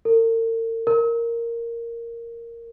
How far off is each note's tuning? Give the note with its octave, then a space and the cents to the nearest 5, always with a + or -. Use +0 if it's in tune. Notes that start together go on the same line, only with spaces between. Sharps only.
A#4 -45
A#4 -5